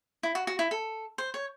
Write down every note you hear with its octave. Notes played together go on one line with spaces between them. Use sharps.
E4
F#4
F#4
E4
A4
C5
C#5